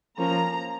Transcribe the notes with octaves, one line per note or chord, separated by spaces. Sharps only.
F3 A#3 C#4 A#5